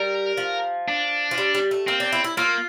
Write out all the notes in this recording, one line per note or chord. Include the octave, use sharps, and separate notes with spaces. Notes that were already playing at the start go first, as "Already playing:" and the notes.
Already playing: G3 A#4
F3
D4
F3
G3
G3
A3
A#3 C4
D4
E4
E4
A#3 F4